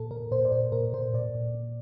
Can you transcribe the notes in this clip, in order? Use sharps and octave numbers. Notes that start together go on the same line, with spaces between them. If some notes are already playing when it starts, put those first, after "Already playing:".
Already playing: A#2 A4
A#2 A#4
A#2 C5
D5
A#2 C5
A#2 A#4
A#2 C5
A#2 D5
A#2
A#2